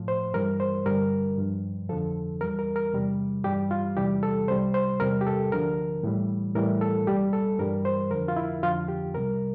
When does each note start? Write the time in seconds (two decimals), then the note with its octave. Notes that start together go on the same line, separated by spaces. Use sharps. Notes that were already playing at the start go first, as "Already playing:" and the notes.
Already playing: A2 F3
0.08 C5
0.34 G2 E3 G3 A#4
0.60 C5
0.86 G2 D3 G3 A#4
1.38 G2 F3
1.89 F2 D3 F3 A4
2.41 E2 E3 G3 A#4
2.59 A#4
2.76 A#4
2.93 E2 C3 G3
3.44 G2 E3 G3 G4
3.71 F4
3.96 E2 C3 E3 G3 G4
4.23 A4
4.48 C2 C3 G3 C5
4.74 C5
5.00 E2 C3 G3 A#4
5.21 G4
5.27 A4
5.52 D2 D3 F3 A#4
6.03 A2 E3 G3
6.55 A2 E3 G3 A#4
6.81 A4
7.07 C2 A#2 G3 G4
7.33 A4
7.59 G2 E3 G3 A#4
7.85 C5
8.11 F2 D3 F3 A#4
8.28 F4
8.36 E4
8.62 F2 D3 F3 F4
8.88 G4
9.14 C2 C3 G3 A#4